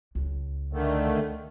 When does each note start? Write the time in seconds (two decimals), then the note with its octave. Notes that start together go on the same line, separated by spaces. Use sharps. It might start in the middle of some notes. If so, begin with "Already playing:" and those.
0.15 C#2
0.73 D3 D#3 A3